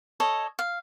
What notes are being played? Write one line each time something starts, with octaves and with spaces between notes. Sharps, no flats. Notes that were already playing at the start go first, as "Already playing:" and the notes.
A4 C#5 D#5
F5